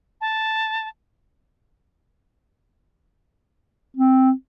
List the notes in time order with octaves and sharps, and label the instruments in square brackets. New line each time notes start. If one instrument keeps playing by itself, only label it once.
[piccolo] A5
[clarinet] C4